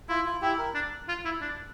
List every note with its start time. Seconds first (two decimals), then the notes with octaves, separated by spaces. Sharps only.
0.09 E4 F4
0.25 F4
0.41 E4 G4
0.58 A#4
0.75 D4
1.09 F4
1.25 E4
1.41 D4